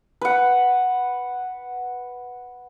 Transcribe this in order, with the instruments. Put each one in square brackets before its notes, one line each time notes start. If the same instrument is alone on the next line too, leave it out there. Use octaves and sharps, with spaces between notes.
[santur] B4 F#5